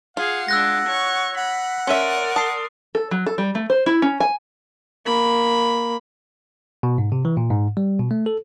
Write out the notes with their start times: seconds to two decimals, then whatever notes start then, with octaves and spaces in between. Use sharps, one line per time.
0.17 F4 G#4 F5 F#5
0.48 G#3 D4 E6 F#6 A#6
0.87 C#5 C#6
1.37 F#5 B5
1.87 C#4 A#4 D5 E5 C6 D#7
2.36 A5 D#6 C7
2.95 A4
3.11 F#3
3.26 A4
3.38 G3
3.55 A3
3.70 C5
3.86 E4
4.02 C#4
4.20 G#5
5.06 A#3 B5
6.83 B2
6.98 G#2
7.12 C3
7.25 E3
7.37 A#2
7.50 G#2
7.77 G3
7.99 B2
8.11 A3
8.26 A4